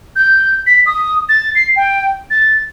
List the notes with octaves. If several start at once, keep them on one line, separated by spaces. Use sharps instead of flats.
G6
B6
D#6
A6
C7
G5
A6